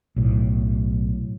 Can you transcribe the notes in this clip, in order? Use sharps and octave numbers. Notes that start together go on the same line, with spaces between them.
B1 A2